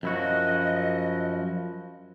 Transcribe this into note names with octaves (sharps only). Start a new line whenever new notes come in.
F#2 F3 E4 F#4 D#5